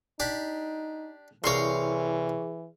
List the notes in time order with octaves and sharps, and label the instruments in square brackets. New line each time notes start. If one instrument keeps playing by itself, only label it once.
[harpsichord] D4 G4 B5 [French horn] D#4
[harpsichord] C2 A#4 F5 [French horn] E3 [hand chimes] G#4 [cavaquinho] C#5 C6